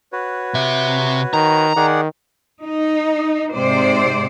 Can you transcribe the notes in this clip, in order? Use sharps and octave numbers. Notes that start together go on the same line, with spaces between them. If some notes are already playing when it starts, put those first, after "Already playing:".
F#4 B4 C#5
C3 E5
D#3 A#5
D#3 G#4 D5 F#5
D#4
G#2 C3 C5 D5